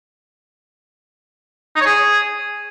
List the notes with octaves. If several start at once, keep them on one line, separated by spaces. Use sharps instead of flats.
D#4
C#5
G#4